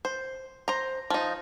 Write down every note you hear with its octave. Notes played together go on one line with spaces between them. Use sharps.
C5
C5 A#5
F3 D#4